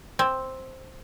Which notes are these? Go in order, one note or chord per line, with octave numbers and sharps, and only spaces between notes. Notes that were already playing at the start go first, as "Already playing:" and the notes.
C4